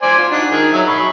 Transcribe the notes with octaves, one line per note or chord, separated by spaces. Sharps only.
C5 D5 G#5
F4
D4 D#4 F#4
D#3 D#4 G#4
F#3 C#5 E5
B5 C#6